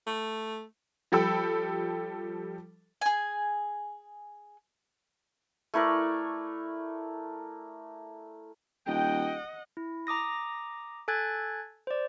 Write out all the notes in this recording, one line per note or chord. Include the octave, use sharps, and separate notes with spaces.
A3
F3 G3 A4 G5 B5 E6
G#4 G#5
A3 E4 A#4 D5
D#1 D#5 F#5 G5
E4
A#5 D6 D#6 A#6
A4 G#5 F#6 G#6 A6
C5 D5